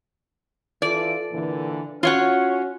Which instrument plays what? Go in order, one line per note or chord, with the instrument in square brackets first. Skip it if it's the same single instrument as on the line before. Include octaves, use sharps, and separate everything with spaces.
[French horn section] E3 F4 A4 [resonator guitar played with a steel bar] D5
[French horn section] A#2 D3 E3
[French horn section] C#4 F#4 [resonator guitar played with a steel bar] F4 C#5 F#5